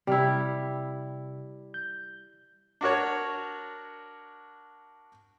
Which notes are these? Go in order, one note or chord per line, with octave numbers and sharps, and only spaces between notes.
C3 G3 E4 F6
G6
D4 F#4 A#4 C#5